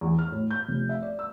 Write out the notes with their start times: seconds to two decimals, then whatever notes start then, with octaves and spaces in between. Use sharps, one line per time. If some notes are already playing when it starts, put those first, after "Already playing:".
0.01 E2
0.19 F6
0.32 A2
0.51 G6
0.68 F1
0.89 E5
1.03 D5
1.19 E6